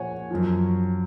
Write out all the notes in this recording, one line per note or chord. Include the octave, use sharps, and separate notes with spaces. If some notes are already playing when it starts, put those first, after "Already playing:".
Already playing: A#2 F3 C#5 F#5 G#5
F#2 F3